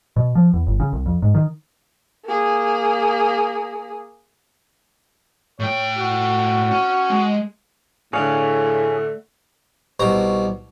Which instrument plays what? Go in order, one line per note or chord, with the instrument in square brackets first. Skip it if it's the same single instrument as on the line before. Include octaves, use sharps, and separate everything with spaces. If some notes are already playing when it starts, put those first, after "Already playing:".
[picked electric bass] B2
F3
E2
G1
C#3
C2
F2
G#2
D#3
[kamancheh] A#3 G#4
[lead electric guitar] A2 G5 [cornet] C#5
[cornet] F#4
[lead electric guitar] C#4
G#3
[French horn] A2 [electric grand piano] D3 D5 F#6 [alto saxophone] A3 [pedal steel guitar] G#4 C#5 F5
[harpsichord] C2 B2 A#5